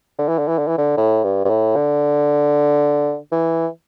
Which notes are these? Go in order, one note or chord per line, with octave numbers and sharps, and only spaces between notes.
D3
E3
D3
E3
D3
E3
D3
A2
G2
G2
A2
D3
E3